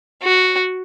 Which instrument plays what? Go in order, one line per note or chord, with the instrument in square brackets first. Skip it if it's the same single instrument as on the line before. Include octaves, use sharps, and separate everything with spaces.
[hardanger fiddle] F#4